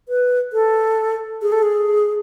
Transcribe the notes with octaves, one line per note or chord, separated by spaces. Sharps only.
B4
A4
G#4
A4
G#4